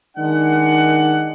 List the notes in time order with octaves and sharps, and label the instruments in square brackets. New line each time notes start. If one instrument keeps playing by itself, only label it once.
[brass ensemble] D#3 G#3 D4 F#5